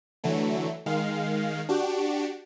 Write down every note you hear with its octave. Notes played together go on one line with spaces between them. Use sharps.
D3 E3 F#3 A3
D#3 G#3 F5
D4 F#4 G4